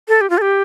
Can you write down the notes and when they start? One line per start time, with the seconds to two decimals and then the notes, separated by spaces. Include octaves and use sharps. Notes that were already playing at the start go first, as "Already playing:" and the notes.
0.08 A4
0.21 G4
0.30 F4
0.38 A4
0.42 G4